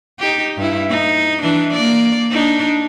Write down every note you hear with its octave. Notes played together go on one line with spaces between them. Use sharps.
D#4 G4
G2 E4
D#4
E3 D4
A#3 D5
D4 D#4